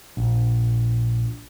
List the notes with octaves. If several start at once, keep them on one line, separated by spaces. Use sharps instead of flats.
A#1